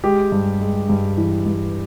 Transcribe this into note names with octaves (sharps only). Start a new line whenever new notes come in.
G#3 G4
G2
G#3
G2
E3
G2